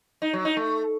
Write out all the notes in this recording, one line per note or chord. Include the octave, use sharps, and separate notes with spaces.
D#4
F#3
D#4
A3